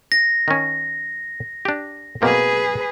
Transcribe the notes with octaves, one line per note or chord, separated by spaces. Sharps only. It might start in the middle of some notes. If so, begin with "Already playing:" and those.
A#6
D#3 C#4
D4 G4
B2 A#3 C4 G#4 B4